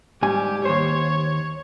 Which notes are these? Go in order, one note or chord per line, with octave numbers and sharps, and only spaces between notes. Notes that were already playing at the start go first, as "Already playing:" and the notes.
G#2 G3 G4 G#5
D#2 C5 C#5